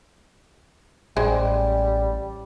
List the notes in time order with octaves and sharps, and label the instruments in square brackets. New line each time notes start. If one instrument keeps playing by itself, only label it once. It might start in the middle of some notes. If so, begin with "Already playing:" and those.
[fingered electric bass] A1 [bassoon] G3 [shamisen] G#3 C5